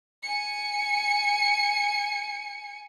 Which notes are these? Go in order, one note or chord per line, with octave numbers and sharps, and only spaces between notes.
G#5 C#7